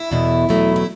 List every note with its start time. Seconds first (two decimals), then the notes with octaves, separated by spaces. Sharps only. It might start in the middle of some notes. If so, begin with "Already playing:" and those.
Already playing: E4
0.11 E2 B2 A3
0.49 E2 B2 F#3 A3
0.76 E4